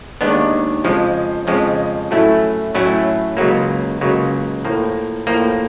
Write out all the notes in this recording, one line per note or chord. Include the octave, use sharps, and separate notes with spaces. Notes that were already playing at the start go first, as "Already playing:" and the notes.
D#2 D#3 G#3 B3 D4
F2 C#3 F3 G#3
F2 C#3 F3 G#3
A2 F#3 A3 C#4 E4
A2 F#3 A3 C#4 E4
C#2 C#3 F#3 A#3
C#2 C#3 F#3 A#3
A2 F3 A#3
A2 F3 A#3